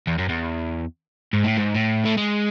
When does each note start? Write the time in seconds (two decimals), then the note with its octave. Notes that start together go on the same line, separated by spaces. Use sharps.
0.07 E2
0.18 F#2
0.29 E2
1.33 G#2
1.44 A2
1.57 G#2
1.75 A2
2.05 A3
2.17 G#3